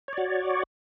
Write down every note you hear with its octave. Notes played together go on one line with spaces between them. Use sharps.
F#4 C#5 D5